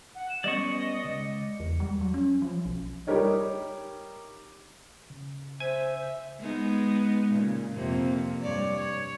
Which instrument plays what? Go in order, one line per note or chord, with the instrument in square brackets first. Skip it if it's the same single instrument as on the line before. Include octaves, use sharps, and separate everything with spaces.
[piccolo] F#5
E7
[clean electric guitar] G3 B3 C#4 [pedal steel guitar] D5 C#6 [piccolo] D#5
[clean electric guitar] C#2
[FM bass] E2
G3
F#3
C#4
F3
B1
[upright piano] G3 D#4 G4 A#4 C#5 D#5
[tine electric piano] C#3
[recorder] C5 [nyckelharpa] E5 [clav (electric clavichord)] G#5
[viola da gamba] G#3 B3 D#4
A#2 C#3
F2 C3 A#3
G2 C#5 D5
C#5